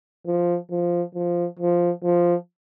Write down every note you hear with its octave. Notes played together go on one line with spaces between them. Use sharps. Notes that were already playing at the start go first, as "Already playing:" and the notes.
F3
F3
F3
F3
F3